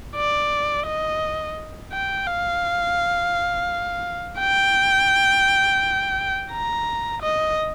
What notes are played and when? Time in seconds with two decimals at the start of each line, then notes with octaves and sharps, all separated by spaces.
0.16 D5
0.86 D#5
1.93 G5
2.28 F5
4.40 G5
6.52 A#5
7.22 D#5